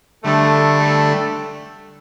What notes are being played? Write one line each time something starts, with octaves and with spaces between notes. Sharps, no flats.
D3 G3 A3 D4
A3